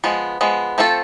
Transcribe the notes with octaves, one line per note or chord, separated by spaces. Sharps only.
F3 G#3 B3
F3 G#3 B3
F3 A3 C4 F4 A4